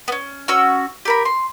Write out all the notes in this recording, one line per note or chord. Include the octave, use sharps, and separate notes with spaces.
B3 C#4
C#4 F#4 E6
G4 A#4 B5
C6